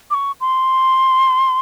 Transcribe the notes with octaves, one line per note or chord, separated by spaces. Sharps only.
D6
C#6
C6